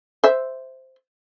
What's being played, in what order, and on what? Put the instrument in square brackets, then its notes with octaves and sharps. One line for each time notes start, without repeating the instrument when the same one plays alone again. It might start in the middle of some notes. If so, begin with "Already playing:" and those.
[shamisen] C5 E5